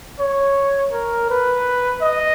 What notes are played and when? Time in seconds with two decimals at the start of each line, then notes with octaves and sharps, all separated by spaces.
0.20 C#5
0.93 A#4
1.30 B4
2.02 D#5